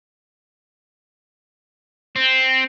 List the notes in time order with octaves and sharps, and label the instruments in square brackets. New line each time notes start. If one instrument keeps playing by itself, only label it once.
[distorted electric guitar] C4